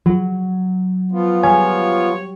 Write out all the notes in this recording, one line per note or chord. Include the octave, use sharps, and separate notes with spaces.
F3 F#3
F3 B3 F4
G3 C#5 G#5